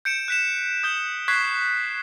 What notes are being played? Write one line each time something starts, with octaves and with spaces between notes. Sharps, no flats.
G6 C#7 D7 E7
F#6 B6 E7
D#6 G6 G7
C#6 F#6 G#6 B6 C7